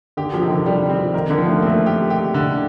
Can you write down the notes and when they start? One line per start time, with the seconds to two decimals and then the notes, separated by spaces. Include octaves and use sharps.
0.17 D3 G4
0.34 F3
0.41 C3 D#3
0.50 D3
0.66 D3 G3
0.90 C4
0.98 F3
1.14 D#3 A#4
1.30 D3
1.38 F3
1.46 A3
1.56 A#3
1.62 A3 C4
1.86 G4
2.10 G4
2.34 D3